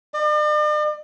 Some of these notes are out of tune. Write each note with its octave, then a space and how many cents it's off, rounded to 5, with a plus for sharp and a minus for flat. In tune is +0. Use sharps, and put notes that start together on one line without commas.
D5 +45